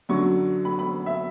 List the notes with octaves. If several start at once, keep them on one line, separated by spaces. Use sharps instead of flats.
F#2 D3 F#3 C#6
B5
B5
E5